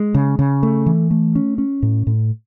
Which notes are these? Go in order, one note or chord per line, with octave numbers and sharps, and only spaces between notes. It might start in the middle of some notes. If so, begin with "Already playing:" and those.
Already playing: G#3
C#3
C#3
A3
E3
A3
C#4
C#4
A2
A2